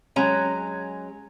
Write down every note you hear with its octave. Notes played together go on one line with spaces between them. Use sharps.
F#3 G#3 C#4